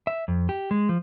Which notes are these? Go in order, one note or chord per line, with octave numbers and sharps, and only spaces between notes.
E5
F2
G4
G#3
F3